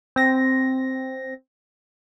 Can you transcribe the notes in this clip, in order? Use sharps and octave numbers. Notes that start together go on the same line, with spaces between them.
C4 A#6